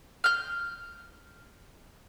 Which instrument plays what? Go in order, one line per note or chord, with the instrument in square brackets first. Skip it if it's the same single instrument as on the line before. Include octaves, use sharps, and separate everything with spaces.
[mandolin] F6 G6